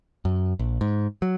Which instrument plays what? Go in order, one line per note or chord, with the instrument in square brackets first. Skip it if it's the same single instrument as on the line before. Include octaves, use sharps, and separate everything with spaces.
[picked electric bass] F#2
A#1
G#2
F#3